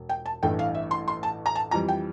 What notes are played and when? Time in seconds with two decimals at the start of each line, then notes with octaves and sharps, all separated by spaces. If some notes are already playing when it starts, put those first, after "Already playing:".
Already playing: E1
0.09 G5
0.26 A5
0.43 A1 G2 E3 A3 G5
0.59 F5
0.74 E5
0.91 C6
1.08 C6
1.23 A5
1.46 A#5
1.55 A5
1.71 F2 E3 G3 A#5
1.88 G5